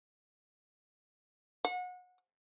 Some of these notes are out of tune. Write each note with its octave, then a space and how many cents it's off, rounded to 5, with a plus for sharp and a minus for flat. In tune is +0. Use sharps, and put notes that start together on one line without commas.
F#5 -30